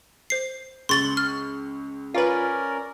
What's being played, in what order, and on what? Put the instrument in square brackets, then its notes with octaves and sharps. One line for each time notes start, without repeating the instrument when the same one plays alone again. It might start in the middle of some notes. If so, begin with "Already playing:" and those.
[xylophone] C5 C7
[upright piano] C#2 C#6 F#7 [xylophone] C6 A6 G7
[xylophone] F6
[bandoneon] C#4 A#4 D5 [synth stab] F4 B4